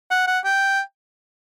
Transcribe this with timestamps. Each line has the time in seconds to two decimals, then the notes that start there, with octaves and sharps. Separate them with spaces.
0.11 F#5
0.27 F#5
0.45 G5